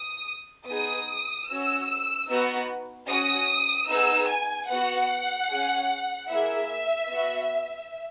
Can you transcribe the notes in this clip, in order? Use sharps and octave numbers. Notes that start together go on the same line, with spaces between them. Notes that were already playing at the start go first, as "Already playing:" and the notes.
Already playing: D#6
B3 D#4 G#4 D#6
C#4 F#4 E6
E6
B3 D#4 F#4
C#4 F#4 D#6
B3 D#4 G#4 E6
G#5
B3 F#4 F#5
C#4 G#4
A#3 E4 G#4 E5
B3 F#4